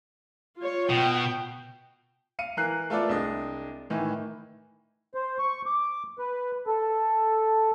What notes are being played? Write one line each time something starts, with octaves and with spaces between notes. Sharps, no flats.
F4 C#5
B2 G5
F5 C#7 D#7
E3 A#4 F#6 C7
A3 F4 A4 B4 D5
C2 G#3 D4 D#5
A2 D#3 E3
C5
C#6
D6
B4
A4